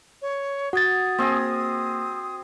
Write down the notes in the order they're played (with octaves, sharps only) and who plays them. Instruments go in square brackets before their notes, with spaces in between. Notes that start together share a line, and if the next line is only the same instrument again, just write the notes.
[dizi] C#5
[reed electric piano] F#4 A6 [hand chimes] F#5 G#6 [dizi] D#6
[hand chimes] A#3 F6 A#6 [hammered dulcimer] C4 G#4